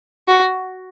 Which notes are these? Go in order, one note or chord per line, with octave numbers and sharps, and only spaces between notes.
F#4